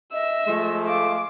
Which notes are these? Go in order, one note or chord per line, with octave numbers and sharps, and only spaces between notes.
D#5 E5 E6
F3 G#3 A3
F5 D6